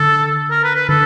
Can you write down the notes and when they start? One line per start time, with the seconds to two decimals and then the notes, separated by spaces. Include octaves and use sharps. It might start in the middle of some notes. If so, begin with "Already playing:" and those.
Already playing: D3 A4
0.51 A#4
0.64 B4
0.75 B4
0.89 D3 A4